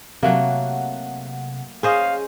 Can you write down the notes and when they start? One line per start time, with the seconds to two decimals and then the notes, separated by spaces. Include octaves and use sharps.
0.23 C3 F#3 A3 A#3 F#5
1.83 C#4 G#4 C5 D#5 F5